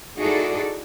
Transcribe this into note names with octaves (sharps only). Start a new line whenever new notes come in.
D#4 E4 F#4 G#4 A4 D5